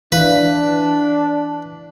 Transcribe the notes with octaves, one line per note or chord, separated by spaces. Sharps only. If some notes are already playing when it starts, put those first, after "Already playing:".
E3 D4 E4 B4 F5